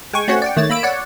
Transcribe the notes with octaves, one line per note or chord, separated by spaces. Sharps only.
G#3 G5 G#5 C#6
A3 C4 C#4 F#4 C#5 F#5
D5 F#5 G5
D#3 A3 C#5 A6
A#3 B5 E6 D7
C#5 D5 F#5